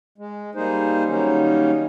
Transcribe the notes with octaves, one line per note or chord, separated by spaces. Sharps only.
G#3
G3 A#3 D#4 G#4 C5
D#3 F#3 G3 A#3 C#4 D#4